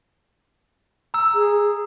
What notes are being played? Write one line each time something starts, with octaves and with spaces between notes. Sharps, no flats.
A#5 E6
G#4